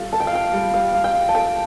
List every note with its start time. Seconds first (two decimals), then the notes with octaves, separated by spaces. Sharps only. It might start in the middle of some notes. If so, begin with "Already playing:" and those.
Already playing: G3 F4 A4
0.12 A4 A5
0.20 G5
0.27 F5
0.33 F4 G5
0.53 G3
0.73 G3 F5
0.94 F4
1.04 G5
1.14 F4
1.29 A5
1.35 A4 G5